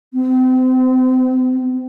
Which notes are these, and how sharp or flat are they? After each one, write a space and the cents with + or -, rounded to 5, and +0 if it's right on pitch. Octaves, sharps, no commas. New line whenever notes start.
C4 -35